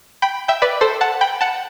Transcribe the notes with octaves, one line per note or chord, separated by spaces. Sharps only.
G5 B5
E5 G5
B4 D5
A4 C5
F#5 A5
G5 B5
F#5 A5